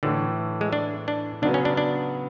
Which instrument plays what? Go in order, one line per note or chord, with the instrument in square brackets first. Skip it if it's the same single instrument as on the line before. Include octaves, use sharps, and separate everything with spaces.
[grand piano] A2 E3 A3 [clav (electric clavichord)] D3
[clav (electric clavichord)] G#3
D4
D4
[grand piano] C#3 F#3 B3 [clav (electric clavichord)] D4
[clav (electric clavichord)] C#4
D4
D4